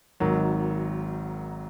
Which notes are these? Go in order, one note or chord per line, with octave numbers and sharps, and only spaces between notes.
G#1 G#2 D#3 F#3